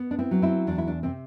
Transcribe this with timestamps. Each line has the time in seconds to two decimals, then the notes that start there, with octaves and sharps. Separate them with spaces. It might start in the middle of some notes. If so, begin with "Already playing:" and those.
Already playing: B3
0.11 D4
0.19 C4 E4
0.31 F#3
0.42 C4 E4
0.67 E2 D4
0.78 E4
0.87 D4
1.03 C3 C4